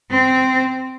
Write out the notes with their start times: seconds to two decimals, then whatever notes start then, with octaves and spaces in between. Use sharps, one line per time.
0.10 C4